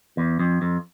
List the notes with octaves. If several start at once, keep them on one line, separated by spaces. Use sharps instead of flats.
E2
F2
F2